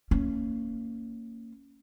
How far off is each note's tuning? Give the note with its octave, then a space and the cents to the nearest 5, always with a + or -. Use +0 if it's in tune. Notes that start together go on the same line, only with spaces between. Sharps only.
A#3 -25 C#4 +0